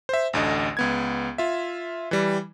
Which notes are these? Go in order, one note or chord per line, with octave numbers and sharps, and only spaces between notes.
C5 E5
A1 D2 D3 D#5
C#2 B3 G#6
F4 E5
E3 G3